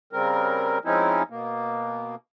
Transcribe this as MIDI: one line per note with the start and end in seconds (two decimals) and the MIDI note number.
0.13 0.79 49
0.13 0.79 55
0.13 0.79 60
0.13 0.79 70
0.85 1.23 53
0.85 1.23 56
0.85 1.23 60
0.85 1.23 61
0.85 1.23 63
0.85 1.23 64
1.30 2.16 47
1.30 2.16 58